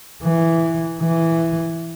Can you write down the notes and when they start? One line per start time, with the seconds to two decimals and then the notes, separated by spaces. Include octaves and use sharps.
0.23 E3
1.01 E3